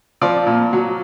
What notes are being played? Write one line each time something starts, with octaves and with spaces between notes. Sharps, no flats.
F3 D5
A#2
F#3